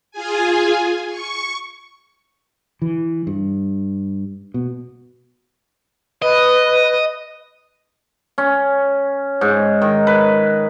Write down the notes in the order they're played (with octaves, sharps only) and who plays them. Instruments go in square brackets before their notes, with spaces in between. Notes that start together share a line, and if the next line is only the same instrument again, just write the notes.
[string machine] F4 G#4 G#5
C#6
[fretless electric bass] E3
G2
B2
[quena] B4 [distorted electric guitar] D#5
[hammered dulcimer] C#4
G#2
D#3
B4